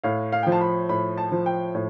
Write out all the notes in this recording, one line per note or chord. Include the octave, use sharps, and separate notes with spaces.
A2 F5
F5
F3 G5
A5
B5
A2 B5
A5
F3
G5
A2